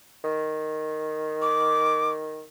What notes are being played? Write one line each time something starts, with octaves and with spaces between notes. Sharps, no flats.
D#3
D6